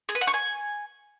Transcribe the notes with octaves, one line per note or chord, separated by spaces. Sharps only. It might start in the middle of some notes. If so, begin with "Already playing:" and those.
G#4
B4
F#5
C#6
G#5